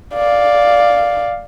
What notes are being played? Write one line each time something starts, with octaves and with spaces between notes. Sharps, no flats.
D5 F5